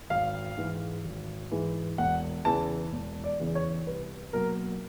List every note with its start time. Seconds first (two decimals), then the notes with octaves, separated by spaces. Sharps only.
0.10 G#1 F5
0.58 G#2 E3 G#3
1.05 G#1
1.51 G#2 E3 G#3
1.98 E1 F#5
2.45 E2 C#3 E3 A5
2.92 E1
3.24 D5
3.40 E2 C#3 E3
3.55 C#5
3.86 C2 B4
4.33 B2 F#3 A#3 A#4